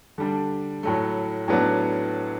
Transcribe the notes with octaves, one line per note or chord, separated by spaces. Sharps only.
D3 G3 D4
A2 F#3 A3
A2 F#3 B3 D4